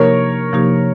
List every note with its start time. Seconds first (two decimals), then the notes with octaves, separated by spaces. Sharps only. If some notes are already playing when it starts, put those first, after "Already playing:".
Already playing: C3 F3 A#3 D#4 G4 A#4 C#5
0.52 C3 F3 A#3 D#4 G4